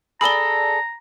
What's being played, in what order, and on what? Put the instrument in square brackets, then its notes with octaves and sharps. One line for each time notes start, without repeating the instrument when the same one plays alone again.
[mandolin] G#4 A4 D5 [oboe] A#5 [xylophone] B5 G7